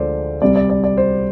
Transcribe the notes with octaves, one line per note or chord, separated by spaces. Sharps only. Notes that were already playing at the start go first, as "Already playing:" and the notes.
Already playing: D2 D3 F3 G#3 C5 D5
C2 C3 G3 D5
D5
D5
D5
C5